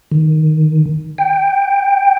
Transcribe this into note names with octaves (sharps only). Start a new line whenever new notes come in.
D#3
G5